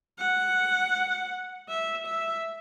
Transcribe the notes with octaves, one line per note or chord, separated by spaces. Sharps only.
F#5
E5
E5